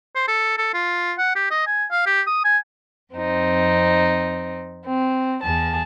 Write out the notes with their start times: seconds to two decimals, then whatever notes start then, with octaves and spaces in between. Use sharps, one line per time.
0.16 C5
0.28 A4
0.58 A4
0.74 F4
1.18 F#5
1.36 G4
1.51 D#5
1.67 G#5
1.91 F5
2.06 G4
2.27 D#6
2.45 G#5
3.14 F2 C4 D#4
4.84 C4
5.43 E2 G#4 A5